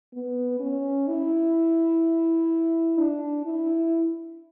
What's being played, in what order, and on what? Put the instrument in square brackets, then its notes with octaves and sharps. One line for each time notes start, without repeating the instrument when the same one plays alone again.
[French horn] B3
C#4
E4
D4
E4